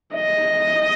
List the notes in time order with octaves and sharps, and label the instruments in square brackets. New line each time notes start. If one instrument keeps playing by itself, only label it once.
[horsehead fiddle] D#5